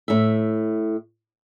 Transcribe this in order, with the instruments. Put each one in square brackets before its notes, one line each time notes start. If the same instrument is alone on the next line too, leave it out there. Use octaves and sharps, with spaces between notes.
[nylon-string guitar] A2 E5